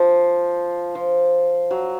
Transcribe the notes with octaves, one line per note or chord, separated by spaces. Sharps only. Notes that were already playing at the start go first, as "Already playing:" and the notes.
Already playing: F3
F3
F#3